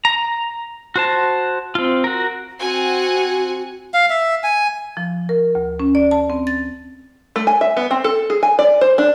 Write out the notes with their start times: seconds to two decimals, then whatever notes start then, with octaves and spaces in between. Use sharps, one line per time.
0.05 A#5
0.96 F#4 C5 A5
1.75 C4 F4
2.04 F#4 A#4
2.61 C4 F#4 F#5 G#5
3.94 F5
4.10 E5
4.44 G#5
4.97 F3
5.29 A#4
5.55 D2
5.80 C#4
5.95 D5
6.11 A5
6.30 C4
6.47 A6
7.36 A3
7.47 G#5
7.61 E5
7.77 B3
7.91 C4
8.04 A4
8.30 G#4
8.43 G#5
8.59 D5
8.81 C5
8.98 D4